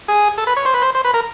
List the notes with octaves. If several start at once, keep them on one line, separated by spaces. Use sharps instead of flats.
G#4
A4
B4
C#5
C5
B4
C5
C5
B4
A#4